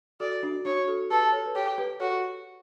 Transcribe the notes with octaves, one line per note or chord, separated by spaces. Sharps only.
F#4 A4 D5
D4 F#4
D4 F#4 C#5
F#4 A4
G4 A4 B4
A4 C#5
B4
G4 A4 C#5
G4 B4
F#4 A4 C#5